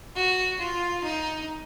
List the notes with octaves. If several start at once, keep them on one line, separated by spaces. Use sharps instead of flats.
F#4
F4
D#4